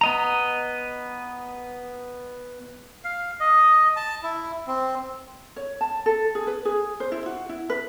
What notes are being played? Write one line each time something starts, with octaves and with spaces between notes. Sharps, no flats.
B3 D#5 A#5
F5
D#5
A5
E4
C4
C#5
A5
A4
G#4
B4
G#4
C5
E4
F#4
E4
B4